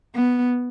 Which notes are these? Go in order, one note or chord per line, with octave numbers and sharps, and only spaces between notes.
B3